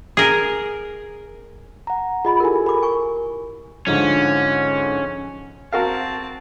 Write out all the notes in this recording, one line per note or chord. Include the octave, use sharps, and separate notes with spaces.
G#4 A#4
F#5 A#5
F4 G#4 D#5 B5
E4 G4 A4 A#4 G#5
A#4 B5 D6
G#5 C#6
G#2 D3 F3 C#4
C4 F#4 A#4 F5 A5